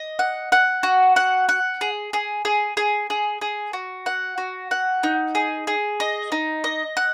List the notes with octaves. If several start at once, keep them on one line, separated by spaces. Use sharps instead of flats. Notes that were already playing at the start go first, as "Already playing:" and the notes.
Already playing: D#5
F#5
F#5
F#4
F#5
F#5
G#4
G#4
G#4
G#4
G#4
G#4
F#4
F#5
F#4
F#5
D#4
G#4
G#4
D#5
D#4
D#5
F#5